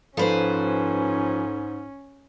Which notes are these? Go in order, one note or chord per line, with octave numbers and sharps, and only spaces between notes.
G#2 F3 C#4 A4 B4 C5 B5